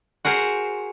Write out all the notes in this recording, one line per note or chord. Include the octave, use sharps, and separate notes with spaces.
F#4 G#4 A#4 C5